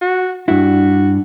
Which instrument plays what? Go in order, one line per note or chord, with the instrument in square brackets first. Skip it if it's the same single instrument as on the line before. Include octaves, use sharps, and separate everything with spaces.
[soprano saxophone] F#4
[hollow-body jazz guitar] G2 E4 [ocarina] D4 [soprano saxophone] F#4